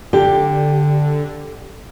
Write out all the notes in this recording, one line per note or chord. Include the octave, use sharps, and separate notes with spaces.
D3 G4